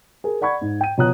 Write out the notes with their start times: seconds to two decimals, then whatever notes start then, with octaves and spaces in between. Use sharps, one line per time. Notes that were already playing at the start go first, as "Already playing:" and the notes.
0.24 G#4 A#4
0.41 D5 F#5 B5 C#6 G#6
0.61 G#2
0.81 G5 D#7
0.97 B2 F3 C#5 A#5 D#6 F#6